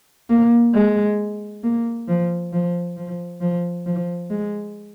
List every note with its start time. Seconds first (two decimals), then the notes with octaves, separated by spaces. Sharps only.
0.30 A#3
0.74 G#3
1.64 A#3
2.08 F3
2.53 F3
2.97 F3
3.41 F3
3.86 F3
4.30 G#3